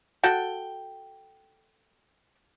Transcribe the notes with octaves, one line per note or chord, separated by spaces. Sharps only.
F#4 A4 G5